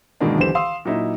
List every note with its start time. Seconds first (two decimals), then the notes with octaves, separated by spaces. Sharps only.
0.20 G#2 B2 D#3 E3 A#3 D4
0.37 B1 D3 E3 G4 C5 E7
0.55 F5 C6 D#6 E6
0.85 A#2 F#3 D#4 E4